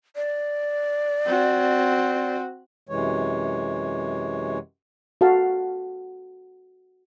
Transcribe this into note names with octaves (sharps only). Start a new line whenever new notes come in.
D5
C4 F#4
F#2 C3 E3 G#3 C#5
F#4 A4 F5 A5